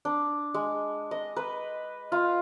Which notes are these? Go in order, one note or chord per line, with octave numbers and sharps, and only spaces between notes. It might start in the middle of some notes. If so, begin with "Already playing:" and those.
D4
G#3
D#5
B4
F4